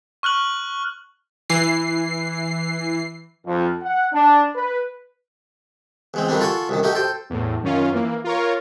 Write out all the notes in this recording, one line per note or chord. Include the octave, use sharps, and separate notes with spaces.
C#6 F6 F#6 F#7
E3 C7
F2
F#5
D4
B4
E2 G#3 C4
F2 D#3 G3 C4 D4
F4 A4 F#5 G#5 A5 C#6
C2 F#2 D#3
A3 D#4 F#4 G4 D#5
A4 C5 G5
E2 A2
F#2 D#3 C#4 F4
E3 A#3
F4 A#4 C#5